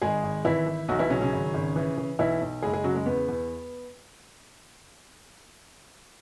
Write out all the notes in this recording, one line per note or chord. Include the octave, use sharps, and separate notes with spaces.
G#1 G#3 G#4
G#1
G#1 E3 E4
E3
B1 F#3 F#4
E3 E4
C#3 F#3 C#4
C#3 C#4
G#1
G#1
E3
E3
B1 E3 E4
B1
F#1 G#3 G#4
G#3 G#4
C#3 F#3 F#4
G#3
E2 B3
E2